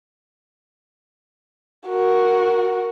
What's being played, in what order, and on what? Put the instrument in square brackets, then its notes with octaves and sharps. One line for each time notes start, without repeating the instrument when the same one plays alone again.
[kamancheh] F#4 A#4